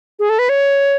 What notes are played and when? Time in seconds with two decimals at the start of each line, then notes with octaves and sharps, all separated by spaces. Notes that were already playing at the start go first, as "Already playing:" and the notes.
0.19 G#4
0.30 A4
0.39 B4
0.49 C#5